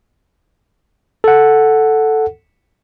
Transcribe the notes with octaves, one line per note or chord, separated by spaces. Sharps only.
A4 F#5